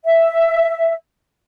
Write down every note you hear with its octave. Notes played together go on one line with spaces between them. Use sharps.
E5